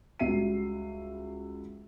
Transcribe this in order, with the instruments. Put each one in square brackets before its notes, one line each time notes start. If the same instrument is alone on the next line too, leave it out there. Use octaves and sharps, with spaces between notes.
[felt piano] C#2 G3 F#4 E5 C7 D#7